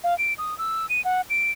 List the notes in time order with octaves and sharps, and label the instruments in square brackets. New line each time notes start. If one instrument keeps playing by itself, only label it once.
[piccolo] F5
D7
D#6
E6
D#7
F#5
D7